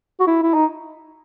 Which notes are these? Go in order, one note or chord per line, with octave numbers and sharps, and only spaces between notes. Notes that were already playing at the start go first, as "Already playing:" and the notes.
F#4
E4
E4
D#4